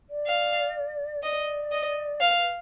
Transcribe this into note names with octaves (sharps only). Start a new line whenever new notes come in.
D5
F5
D5 D#5
D#5
B4 F5
B4